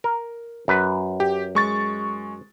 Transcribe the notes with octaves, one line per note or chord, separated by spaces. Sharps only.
A#4
F#2 B4
G4
G#3 C#6 A6